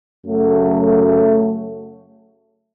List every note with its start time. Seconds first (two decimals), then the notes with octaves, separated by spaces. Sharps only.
0.24 F#2 C#3 F#3 A3